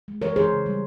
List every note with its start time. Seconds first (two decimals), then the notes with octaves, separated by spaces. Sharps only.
0.08 G#3
0.22 E3 A#4 C#5
0.36 E3 G#4 C5
0.51 C#3
0.66 G3